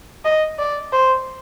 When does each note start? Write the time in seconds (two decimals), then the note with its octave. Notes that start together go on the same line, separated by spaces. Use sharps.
0.25 D#5
0.59 D5
0.92 C5